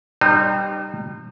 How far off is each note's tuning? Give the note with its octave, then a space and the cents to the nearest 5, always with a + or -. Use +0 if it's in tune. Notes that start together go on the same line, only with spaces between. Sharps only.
G3 +0 D#4 -35 C5 +0